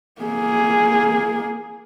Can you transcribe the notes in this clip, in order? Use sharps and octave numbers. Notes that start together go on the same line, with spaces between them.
A#3 G#4